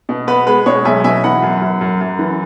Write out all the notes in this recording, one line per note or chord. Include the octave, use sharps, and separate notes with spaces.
B2
B3 B4
G#3 B4
B2 G#4 C#5
B1 E5 G#5
B2 E5 G#5
E3 F#5 B5
F#2
F#2
F#2
F#2
E3